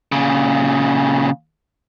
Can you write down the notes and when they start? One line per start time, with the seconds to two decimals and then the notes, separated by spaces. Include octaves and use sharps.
0.12 A#2 C#3